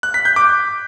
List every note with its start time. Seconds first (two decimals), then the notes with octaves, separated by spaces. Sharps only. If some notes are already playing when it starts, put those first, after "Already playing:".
0.03 F#6
0.14 B6
0.25 G6
0.36 D6